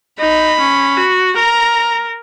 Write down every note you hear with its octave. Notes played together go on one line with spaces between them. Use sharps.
D#4 B5
C#4
F#4
A#4 A#5